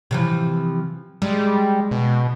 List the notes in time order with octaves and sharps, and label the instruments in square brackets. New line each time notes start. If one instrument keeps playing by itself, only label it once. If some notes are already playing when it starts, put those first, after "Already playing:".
[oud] C3 E3 F3
[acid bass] G3 [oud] G#3
[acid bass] B2